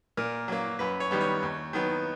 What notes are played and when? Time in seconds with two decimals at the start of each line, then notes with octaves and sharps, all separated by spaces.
0.17 A#2 A#4
0.48 F#3 A#3
0.79 F#2 B4
1.00 C#5
1.11 D#3 G3 B3
1.21 C#5
1.42 D#2
1.73 D#3 F#3 B3